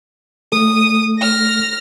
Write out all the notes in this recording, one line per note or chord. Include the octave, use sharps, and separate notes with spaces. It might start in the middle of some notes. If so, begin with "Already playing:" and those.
A3 A4 D#6
F6 A#6